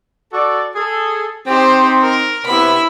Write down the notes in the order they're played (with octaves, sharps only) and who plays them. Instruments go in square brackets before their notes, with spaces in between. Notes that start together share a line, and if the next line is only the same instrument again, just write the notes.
[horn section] F#4 A4 D5
G#4 A4
[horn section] C4 D#4 [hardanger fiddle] G4 C5
[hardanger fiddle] A#4
[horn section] C3 B3 [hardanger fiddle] E4 B5